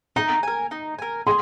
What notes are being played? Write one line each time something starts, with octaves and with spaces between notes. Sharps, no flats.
D#4 A#5
A#4 G#5
D#4
A#4 G#5
G#4 C6